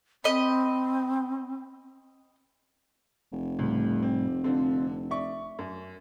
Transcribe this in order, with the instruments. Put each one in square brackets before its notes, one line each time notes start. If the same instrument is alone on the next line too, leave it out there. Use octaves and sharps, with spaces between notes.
[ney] C4 [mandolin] D#5 B5
[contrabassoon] F1
[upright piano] C#2 [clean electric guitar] A2 G3
[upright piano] C4
[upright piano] D3 [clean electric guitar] C4 F4 C5
[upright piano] D5 C#6 [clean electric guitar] E5
[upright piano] F#2